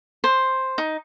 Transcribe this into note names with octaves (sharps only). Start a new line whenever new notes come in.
C5
D#4